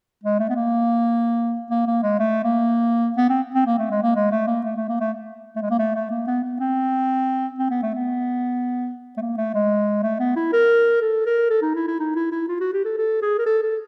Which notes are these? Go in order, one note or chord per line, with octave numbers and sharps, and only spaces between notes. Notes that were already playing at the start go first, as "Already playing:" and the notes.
G#3
A3
B3
A#3
A#3
A#3
G#3
A3
A#3
B3
C4
C4
A#3
A3
G#3
A#3
G#3
A3
A#3
A3
A3
A#3
A3
A3
G#3
A#3
A3
A3
A#3
B3
B3
C4
C4
B3
A3
B3
A3
A#3
A3
G#3
A3
B3
E4
A#4
A4
A#4
A4
D#4
E4
E4
D#4
E4
E4
F4
F#4
G4
A4
A4
G#4
A#4
A4
A4